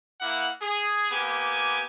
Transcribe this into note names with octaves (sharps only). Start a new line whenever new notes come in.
A#3 E4 F#5
G#4
A#3 B3 G4 G#5